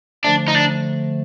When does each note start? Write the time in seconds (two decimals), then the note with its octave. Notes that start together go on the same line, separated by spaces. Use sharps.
0.24 D3 F3 A3 D4
0.48 D#4
0.55 D4